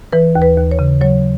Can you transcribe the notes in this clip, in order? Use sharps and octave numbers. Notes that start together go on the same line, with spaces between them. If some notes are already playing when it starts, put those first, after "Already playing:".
E3 B4
D#2
B4
D#2
C#5
C#3
F#3 C#5